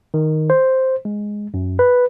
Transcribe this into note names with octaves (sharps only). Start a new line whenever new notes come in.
D#3
C5
G#3
F#2
B4